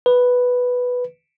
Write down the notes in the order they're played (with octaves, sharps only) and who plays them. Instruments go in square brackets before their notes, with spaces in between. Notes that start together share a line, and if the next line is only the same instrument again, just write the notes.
[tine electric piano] B4